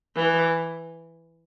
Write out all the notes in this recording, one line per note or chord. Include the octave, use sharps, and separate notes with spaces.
E3